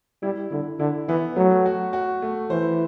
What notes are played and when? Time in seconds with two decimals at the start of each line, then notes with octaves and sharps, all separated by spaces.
0.23 G3 E4
0.51 D3 E4
0.79 D3 E4
1.08 E3 B3
1.36 F#3 A3
1.66 F#4
1.93 F#4
2.22 A3
2.50 E3 C5